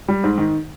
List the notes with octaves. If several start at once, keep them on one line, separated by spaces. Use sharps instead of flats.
G3
G#2
D#3